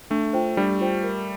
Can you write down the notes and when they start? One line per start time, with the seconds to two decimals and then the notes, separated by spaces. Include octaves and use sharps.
0.10 A3 D4
0.33 F4 C5 G5
0.57 G3 D4
0.80 F4 C5 G5
1.03 A#4